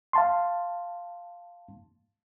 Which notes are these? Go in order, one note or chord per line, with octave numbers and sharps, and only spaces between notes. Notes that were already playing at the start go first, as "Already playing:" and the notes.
F5 A5 C6